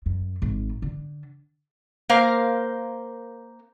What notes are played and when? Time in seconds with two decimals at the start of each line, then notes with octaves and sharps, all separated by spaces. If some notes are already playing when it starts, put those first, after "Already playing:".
0.06 F#2
0.42 G#1
0.82 D3
2.09 A#3 A#4 C5 F5